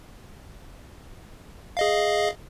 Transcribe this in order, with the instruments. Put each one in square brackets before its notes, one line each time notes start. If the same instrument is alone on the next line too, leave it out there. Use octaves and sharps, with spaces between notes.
[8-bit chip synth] G#4 D#5 F5